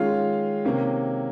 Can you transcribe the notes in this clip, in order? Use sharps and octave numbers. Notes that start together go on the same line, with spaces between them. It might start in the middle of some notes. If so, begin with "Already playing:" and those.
Already playing: D#3 G#3 C#4 F4 F5
C3 D#3 A#3 C#4